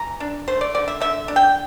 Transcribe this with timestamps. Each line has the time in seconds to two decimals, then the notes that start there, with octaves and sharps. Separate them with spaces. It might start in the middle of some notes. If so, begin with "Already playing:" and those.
Already playing: E3 A#5
0.20 D4
0.48 A3 C5
0.61 D5
0.74 D3 D5
0.88 E5
1.00 D3 E5
1.28 D4
1.36 G5